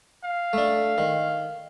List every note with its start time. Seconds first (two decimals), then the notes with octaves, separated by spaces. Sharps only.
0.24 F5
0.53 A3 D4
0.98 D#3